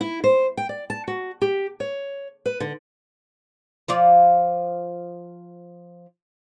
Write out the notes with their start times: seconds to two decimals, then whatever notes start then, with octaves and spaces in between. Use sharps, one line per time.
0.01 E4
0.24 C5
0.57 G5
0.69 D5
0.90 A5
1.08 F#4
1.42 G4
1.80 C#5
2.45 B4
2.60 D3
3.88 F3 F4 D5